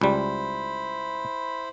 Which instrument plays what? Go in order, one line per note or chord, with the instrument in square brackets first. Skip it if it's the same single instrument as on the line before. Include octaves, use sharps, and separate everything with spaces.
[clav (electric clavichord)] C#2 G3 [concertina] E4 C5 B5